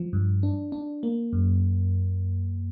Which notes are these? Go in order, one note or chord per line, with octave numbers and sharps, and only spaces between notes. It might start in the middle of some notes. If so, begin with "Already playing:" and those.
Already playing: F3
G2
D4
D4
A#3
F#2